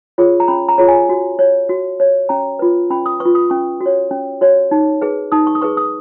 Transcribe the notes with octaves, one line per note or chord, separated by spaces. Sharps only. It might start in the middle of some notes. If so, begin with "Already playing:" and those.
F4 G#4 C#5
A#5
C#4 B5
A#5
F4 G#4 C#5
G#5
F#4
C#5
F#4
C#5
C#4 A#5
F4 B4
C#4 B5
D#6
B4 C#6
F4
D#6
C#4 C#6
F#4
C#5
C#4
F#4 C#5
D#4
G#4 B4
D#4 D#6
C#6
D#6
G#4 B4 C#6
D#6